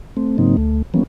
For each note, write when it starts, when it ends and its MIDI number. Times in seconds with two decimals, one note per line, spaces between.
0.17 0.38 57
0.17 0.38 60
0.38 0.56 44
0.38 0.56 49
0.38 0.56 54
0.38 0.56 58
0.38 0.56 60
0.38 0.56 63
0.57 0.82 38
0.57 0.82 57
0.94 1.03 52
0.94 1.03 53
0.94 1.03 55
0.94 1.03 58
0.94 1.03 59
0.94 1.03 61